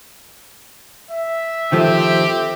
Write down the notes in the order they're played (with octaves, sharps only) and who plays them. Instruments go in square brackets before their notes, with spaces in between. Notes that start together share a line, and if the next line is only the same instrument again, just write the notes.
[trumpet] E5
[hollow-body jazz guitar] D#3 F3 A3 [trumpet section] C4 G4